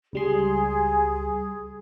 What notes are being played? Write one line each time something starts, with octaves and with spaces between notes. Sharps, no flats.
C#2 G3 G#4 C6